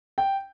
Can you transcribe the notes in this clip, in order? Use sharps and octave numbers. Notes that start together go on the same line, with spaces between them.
G5